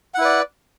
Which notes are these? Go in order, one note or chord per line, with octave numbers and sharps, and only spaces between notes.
E4 B4 D5 F#5